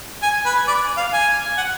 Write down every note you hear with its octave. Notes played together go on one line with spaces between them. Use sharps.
G#5
B4
D5
F5
G#5
F#5